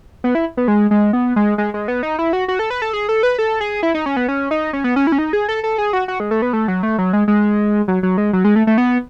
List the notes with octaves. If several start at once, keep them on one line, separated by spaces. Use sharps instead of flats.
B3
E4
B3
G#3
G#3
B3
G#3
G#3
G#3
B3
D#4
E4
F#4
F#4
A4
B4
A4
G#4
A4
B4
A4
G#4
E4
D#4
C#4
B3
C#4
D#4
C#4
B3
C#4
E4
C#4
D#4
G#4
A4
A4
G#4
F#4
F#4
G#3
A3
B3
A3
F#3
A3
F#3
G#3
G#3
F#3
F#3
G#3
F#3
G#3
A3
A3
B3